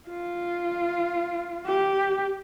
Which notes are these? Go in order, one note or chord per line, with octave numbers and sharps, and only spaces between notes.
F4
G4